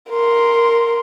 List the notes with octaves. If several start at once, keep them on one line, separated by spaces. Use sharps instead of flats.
A#4 C6